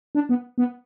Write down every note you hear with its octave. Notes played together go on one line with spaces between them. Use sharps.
D4
B3
B3